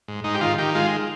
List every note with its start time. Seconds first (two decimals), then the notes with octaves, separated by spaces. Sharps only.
0.08 G#2
0.24 G#2 D#4
0.35 G4
0.41 D#3 F4
0.58 D#3 G4
0.75 G#3 F4